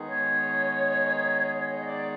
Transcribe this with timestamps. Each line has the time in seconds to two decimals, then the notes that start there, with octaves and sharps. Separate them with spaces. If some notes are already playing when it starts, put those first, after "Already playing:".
Already playing: D#3 G#3 B3 D#4 G#4
0.08 C#5
1.77 D#5
1.85 D5